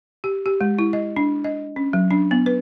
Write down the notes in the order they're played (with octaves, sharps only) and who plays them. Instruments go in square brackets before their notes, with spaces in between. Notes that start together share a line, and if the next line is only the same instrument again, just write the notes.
[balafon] G4
G4
G#3
E4
D#5
D4
D#5
C#4
F#3
D4
B3
B4